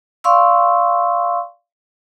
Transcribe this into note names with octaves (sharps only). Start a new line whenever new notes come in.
D5 F5 C6 C#6 E6